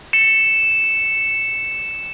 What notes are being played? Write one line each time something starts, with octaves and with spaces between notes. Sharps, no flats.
C#7 E7